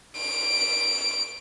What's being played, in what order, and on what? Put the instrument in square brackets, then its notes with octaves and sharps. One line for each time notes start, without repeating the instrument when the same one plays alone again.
[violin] D7